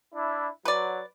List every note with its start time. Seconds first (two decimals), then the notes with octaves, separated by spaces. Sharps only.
0.14 D4 E4
0.65 F#3 B4 D5